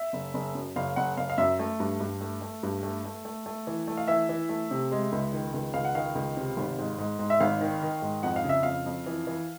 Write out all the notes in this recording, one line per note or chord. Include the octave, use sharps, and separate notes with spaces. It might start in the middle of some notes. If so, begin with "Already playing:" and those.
Already playing: E5
F#1
F#1
F#2
F#1 F5
F#1 F#5
F#1 F5
F5
F#2 E5
A3
G2
G2
A3
A3
G2
A3
A3
A3
A3
E3
A3
F5
E3 E5
E3
A3
C3
G#3
C#2
D#3
C#2
C#2 F5
F#5
D#3 F5
C#2
C3
G#1
G#2
G#2
G#2
E5
G#1 F5
D#3
D#3
G#2
F2 F#5
F5
C#3
E5
F2 F5
F2
E3
E3